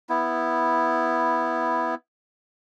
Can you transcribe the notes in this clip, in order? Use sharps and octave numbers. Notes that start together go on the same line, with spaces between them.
B3 E4